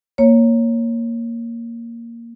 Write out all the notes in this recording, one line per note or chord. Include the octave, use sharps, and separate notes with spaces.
A#3 C#5